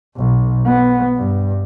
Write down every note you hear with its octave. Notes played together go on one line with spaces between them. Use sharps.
B1
B3
G2